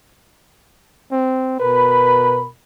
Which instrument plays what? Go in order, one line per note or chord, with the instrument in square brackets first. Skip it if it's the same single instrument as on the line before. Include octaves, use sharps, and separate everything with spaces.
[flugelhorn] C4
[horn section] B2 A#4 B5 [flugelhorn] B4